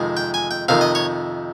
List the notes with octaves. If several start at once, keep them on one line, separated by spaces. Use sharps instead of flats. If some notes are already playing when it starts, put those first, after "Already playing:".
Already playing: F2 C3 D#3 G#3
G5
G#5
G5
F2 C3 D#3 F5
D#5
C#5